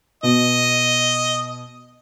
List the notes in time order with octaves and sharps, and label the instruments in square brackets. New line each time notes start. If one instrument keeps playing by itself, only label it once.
[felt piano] B2 [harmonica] D#5